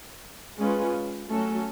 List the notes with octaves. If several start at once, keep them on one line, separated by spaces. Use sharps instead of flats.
G#3 C#4 F4 B4
F#3 A3 C#4 F#4 A4